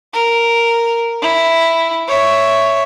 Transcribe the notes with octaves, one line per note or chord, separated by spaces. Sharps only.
A#4
E4
C#5 E5